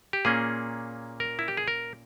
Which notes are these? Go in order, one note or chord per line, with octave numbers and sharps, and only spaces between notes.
G4
A#2 A#3 C#4 G#4
A#4
E4
G4
G#4
A#4